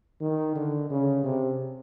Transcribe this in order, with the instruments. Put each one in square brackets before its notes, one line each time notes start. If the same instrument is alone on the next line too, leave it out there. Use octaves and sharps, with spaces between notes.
[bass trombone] D#3
D3
C#3
C3